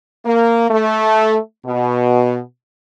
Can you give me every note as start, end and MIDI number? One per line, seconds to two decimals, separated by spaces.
0.26 0.66 58
0.70 1.37 57
1.66 2.39 47